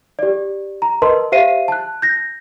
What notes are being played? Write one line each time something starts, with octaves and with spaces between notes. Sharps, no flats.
G4 D5
A#5
A#4 B4 D#5 A5 C6
G4 C5 E5 F5 C7 D#7
A5 F#6
G6 A#6